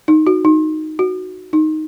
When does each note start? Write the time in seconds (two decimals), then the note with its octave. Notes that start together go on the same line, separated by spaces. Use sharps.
0.08 D#4
0.27 F#4
0.45 D#4
0.99 F#4
1.53 D#4